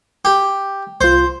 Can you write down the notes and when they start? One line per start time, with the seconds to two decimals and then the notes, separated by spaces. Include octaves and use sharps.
0.25 G4
1.01 C2 F4 C5